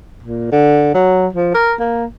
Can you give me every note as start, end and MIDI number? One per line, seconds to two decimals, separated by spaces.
0.23 0.51 46
0.52 0.90 50
0.94 1.27 54
1.33 1.52 53
1.54 1.73 70
1.79 2.05 58